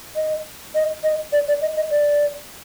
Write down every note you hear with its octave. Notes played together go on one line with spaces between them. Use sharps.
D#5
D#5
D#5
D5
D5
D#5
D#5
D5